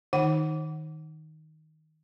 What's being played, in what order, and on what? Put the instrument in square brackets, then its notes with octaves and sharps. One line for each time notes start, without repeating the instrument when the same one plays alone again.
[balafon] D#3 D#4 F#5